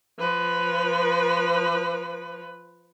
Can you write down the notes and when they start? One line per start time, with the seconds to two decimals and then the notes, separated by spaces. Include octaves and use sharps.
0.19 F3 B4